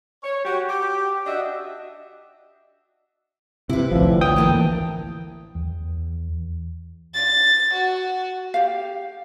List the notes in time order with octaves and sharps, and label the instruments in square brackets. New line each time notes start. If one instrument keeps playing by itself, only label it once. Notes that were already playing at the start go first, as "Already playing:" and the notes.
[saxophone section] C#5
F#4 G4
G4
D4 F#4 D#5 E5
[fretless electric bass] C3 [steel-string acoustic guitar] E4 B4
[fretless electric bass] A1 D2 [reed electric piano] F3
[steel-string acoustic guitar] C#5 [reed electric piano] G5 D#6
[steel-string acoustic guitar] E3 A#3 A4
[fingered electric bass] E2
[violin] A6
F#4
[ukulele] G4 F5